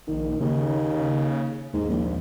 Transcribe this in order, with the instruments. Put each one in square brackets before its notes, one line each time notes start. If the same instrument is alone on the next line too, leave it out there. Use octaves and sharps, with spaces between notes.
[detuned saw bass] A#1 [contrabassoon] D#3
[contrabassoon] D#2 [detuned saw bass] C#3
[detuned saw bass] D#2 [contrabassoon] G#2
[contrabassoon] A#1